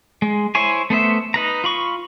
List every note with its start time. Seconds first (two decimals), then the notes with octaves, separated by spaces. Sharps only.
0.22 G#3
0.55 E4 C5 C#5 G#5
0.90 A3 B3 C5 E5
1.34 D#4 B4 A#5
1.64 F4 B5 C#6